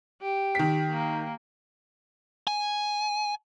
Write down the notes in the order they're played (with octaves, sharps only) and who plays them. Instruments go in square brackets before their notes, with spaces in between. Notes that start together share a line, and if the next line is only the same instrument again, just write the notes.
[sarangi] G4
[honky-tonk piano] D#3 B6
[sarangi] A#3
[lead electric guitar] G#5